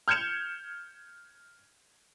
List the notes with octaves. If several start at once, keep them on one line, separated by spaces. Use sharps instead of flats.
F6 G6 G#6 C#7 E7 F7